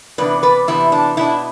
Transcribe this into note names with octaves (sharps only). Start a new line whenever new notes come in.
C3 E3 B3 D4 B4 D5
B4 D5
C3 E3 B3 D4 E4
D4
B2 B3 D4 E4